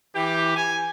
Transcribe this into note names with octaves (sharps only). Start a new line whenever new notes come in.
E3 G4
G#5